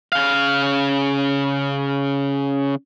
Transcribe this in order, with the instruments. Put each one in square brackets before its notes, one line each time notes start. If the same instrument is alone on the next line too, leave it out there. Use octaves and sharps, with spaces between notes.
[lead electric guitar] C#3 F5